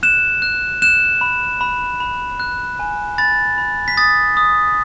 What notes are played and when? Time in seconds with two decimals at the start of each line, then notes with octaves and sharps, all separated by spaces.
0.03 F#6 E7
0.42 F#6
0.82 F#6 E7
1.21 B5
1.61 B5
2.00 B5
2.40 F#6
2.79 G#5
3.18 B5 A6
3.58 B5
3.88 B6
3.97 D#6 A6
4.37 D#6